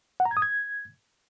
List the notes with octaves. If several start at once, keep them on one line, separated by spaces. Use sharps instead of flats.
F#5
A#5
G#6
D#6
G#6